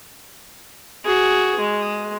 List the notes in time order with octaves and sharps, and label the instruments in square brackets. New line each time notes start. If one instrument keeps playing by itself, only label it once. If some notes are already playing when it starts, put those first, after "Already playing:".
[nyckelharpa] F#4 G#4
G#3